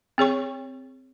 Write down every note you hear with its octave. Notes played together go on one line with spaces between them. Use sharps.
C4 G#4 C#5 C#6